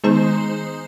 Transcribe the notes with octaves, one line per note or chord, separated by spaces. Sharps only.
D#3 G#3 B3 D#4 G#4 C5